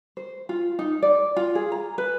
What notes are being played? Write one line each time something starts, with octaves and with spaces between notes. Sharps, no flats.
C5
F4
D#4
D5
F4
G#4
A#5
B4